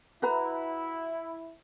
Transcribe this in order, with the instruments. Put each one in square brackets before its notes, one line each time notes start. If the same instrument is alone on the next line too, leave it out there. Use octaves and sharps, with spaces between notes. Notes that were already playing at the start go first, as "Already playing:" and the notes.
[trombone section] E4 [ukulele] F#4 B4 A#5